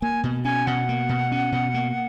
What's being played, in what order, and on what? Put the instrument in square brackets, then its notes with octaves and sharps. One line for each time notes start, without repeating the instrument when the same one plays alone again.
[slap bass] A#3 [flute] G#5
[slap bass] B2
[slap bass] C#4 [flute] G#5
[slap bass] B2 [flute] F#5
[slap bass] A#3
B2
C#4
B2
A#3